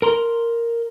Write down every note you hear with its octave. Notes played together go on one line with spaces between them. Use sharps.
A#4 A#5 C6